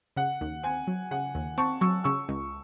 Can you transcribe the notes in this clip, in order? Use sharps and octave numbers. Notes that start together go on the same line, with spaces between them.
C#3 F#5
D#2
C4 G#5
F#3
C#3 F#5
D#2
C4 A5 C#6
F#3 C#6 E6
C#3 C#6 E6
C#2